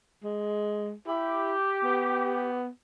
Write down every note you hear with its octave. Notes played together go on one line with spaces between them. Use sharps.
G#3
E4 G4
B3